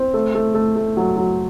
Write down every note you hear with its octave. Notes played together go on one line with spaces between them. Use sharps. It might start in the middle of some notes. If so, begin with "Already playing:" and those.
Already playing: C4
A3
A3
A3
A3
F#3
F#3